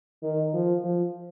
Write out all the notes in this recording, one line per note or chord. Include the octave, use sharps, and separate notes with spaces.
D#3
F3
F3